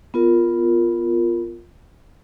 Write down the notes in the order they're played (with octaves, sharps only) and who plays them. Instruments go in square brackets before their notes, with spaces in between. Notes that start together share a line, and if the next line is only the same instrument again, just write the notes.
[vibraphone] B3 F4 A#4